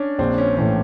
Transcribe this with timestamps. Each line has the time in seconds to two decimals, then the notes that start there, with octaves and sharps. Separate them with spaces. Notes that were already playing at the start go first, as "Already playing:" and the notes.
Already playing: C#4 D4
0.18 A#1 C4
0.38 C#4
0.57 A2 E3 C#4